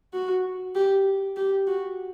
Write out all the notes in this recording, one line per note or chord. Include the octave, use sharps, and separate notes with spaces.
F#4
G4
G4
F#4